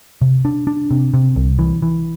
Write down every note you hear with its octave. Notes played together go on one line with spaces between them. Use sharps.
C3
D4
D4
C3
C3
C2
E3
E3